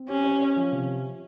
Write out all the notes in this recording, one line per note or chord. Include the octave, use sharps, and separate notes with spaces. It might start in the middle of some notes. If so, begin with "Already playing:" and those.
Already playing: C4
C#4 G4
C#5
C#5
F3
C3